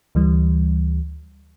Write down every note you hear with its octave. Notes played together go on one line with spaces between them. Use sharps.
D2 E3 G3